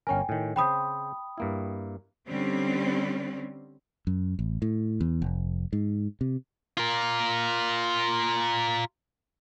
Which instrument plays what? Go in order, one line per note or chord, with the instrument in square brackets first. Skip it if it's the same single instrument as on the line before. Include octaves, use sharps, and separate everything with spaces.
[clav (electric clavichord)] G1 C#4 A#4 [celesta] G5 G#5
[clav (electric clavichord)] A2 D#3
[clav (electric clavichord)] C#3 C4 C5 [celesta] G5 B5 D#6
[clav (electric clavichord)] G2 A#3 E4
[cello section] D3 G3 C4 C#4
[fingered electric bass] F#2
A1
A2
E2
F1
G#2
C3
[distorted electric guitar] F4 A#4